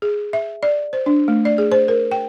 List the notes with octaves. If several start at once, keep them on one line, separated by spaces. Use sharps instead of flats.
G#4
E5
D5
C5
D4
A3
D5
G#4
C5
A#4
G5